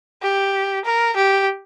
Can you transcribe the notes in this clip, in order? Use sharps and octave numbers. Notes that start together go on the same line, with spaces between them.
G4
A#4
G4